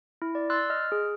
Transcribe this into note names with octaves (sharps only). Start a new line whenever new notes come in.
E4
D5
C6 E6 F#6 A6
D#5 F6
G#4